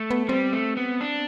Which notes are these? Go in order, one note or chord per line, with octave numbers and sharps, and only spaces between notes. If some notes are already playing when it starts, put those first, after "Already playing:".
Already playing: A3
B3
G3 C4
A3
B3
D4